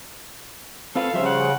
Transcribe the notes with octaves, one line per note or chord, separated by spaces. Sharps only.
C4 F4 A4 B4 F5
C#3 F3 G3 C5 E5
F#5